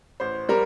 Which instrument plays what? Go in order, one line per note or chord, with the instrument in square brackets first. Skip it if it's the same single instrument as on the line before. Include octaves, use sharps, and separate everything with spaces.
[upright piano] A1 C5
G3 A#4